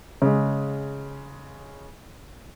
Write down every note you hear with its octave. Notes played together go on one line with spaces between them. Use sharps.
C#3 G#3